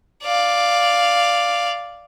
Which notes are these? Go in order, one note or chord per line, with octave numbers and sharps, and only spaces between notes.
D5 F5